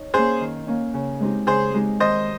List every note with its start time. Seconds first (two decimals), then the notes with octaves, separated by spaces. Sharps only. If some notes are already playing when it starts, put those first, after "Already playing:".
Already playing: D#4 C#5
0.14 A#3 C#4 G#4 C5
0.40 D#3
0.67 A#3 C#4
0.94 C#3
1.20 G#3 C4 D#4 G4
1.47 C#3 G#4 C5
1.74 G#3 C4 D#4 G4
2.00 D#3 C5 D#5